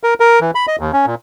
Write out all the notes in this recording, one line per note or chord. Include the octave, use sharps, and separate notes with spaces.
A#4
A#4
E3
B5
D#5
D#2
C#4
A#2